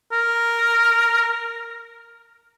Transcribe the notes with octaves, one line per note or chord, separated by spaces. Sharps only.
A#4